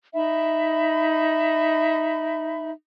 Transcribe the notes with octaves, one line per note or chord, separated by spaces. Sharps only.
D#4 E5 B5